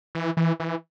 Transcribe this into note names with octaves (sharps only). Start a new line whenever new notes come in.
E3
E3
E3